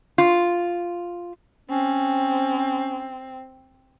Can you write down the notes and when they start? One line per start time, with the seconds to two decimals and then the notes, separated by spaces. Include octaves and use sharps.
0.18 F4
1.70 C4 C#4